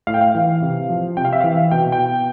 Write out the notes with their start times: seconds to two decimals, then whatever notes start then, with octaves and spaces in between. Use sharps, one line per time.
0.07 A2 F5
0.14 G5
0.21 F5
0.35 E3
0.62 C3
0.89 F3
1.17 C3 G5
1.25 F5
1.33 E5
1.41 E3 F5
1.71 B2 G5
1.92 G5